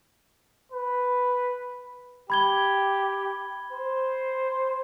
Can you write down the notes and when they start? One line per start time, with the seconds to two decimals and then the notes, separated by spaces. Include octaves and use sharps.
0.72 B4
2.30 G4 B5 G#6 G7
3.73 C5